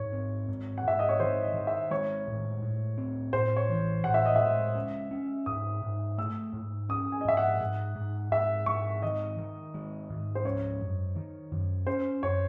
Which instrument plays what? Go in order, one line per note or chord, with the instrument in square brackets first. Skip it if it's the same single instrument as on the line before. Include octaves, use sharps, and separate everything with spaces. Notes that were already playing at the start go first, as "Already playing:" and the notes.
Already playing: [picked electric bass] G#2 [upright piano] C#5
[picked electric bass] C4
G#2
[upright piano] F#5
[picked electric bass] G#2 [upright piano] E5
[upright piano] D#5
C#5
[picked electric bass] D#3 [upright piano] C5
[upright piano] D#5
[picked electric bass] D#3
[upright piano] E5
[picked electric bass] G#3 [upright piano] C#5
[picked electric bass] A2
A2
C4
[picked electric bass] A2 [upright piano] C5
[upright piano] C#5
[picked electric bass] E3
[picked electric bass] A2 [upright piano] F#5
[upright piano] E5
D#5
[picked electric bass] G#3 [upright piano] E5
[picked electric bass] C#4
C#4
[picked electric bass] G#2 [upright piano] D#6
[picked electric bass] G#2
[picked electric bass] A3 [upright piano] E6
[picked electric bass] G#2
[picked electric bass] C#4 [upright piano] D#6
[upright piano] G#5
D#5
[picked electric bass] G#2 [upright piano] E5
[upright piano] F#5
[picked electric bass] G#2
G#2
[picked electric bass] G#2 [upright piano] E5
[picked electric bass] G#2 [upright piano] C#6
[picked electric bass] D#3 [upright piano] D#5
[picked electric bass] D#3
G#3
G#2
[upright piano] C5
[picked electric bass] C#4 [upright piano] C#5
[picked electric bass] F#2
D#3
F#2
[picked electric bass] C#4 [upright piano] C5
[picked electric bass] F#2 [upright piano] C#5